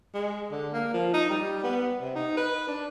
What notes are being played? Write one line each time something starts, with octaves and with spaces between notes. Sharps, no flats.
G#3
D3
A#3
F3
D#4
G3
B3
C3
D#4
B4
D4